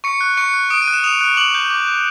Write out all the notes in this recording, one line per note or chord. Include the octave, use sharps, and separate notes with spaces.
C#6 C#7
F#6
C#6 C#7
F#6
D#6 D7
D#7
F#6
E7
D#6 F7
F#6
D6 F#7
G6
D6
G6